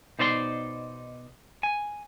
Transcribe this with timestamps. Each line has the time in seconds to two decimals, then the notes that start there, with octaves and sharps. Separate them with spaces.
0.19 B2 D#4 C5 D5 E5 C6
1.63 G#5